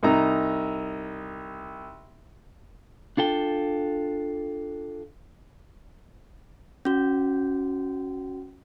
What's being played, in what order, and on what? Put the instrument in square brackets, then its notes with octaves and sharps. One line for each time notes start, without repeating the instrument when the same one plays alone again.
[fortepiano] C2 D#4 A#5
[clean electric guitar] D4 F4 A4 G5
[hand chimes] C#4 F#4